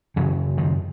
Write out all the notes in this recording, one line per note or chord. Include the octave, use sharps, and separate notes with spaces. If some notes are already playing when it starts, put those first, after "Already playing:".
F#2 C#3 E3 F#3
D#3 F3